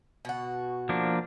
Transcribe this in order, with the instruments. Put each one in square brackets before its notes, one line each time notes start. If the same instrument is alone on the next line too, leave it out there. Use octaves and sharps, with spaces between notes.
[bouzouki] B2 F#4
[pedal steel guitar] F3 A#3 D4